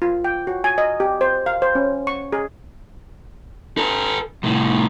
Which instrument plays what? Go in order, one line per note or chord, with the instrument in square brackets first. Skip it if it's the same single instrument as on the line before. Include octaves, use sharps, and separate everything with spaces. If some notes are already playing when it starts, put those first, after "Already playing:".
[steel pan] F4
G5
F#4
G#5
D#5
G4
C5
F5
C5
C#4
C#6
G#4
[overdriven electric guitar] A4 B4
C2 A2